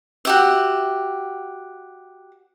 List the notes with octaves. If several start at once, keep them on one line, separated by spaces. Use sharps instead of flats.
F#4 G4 E5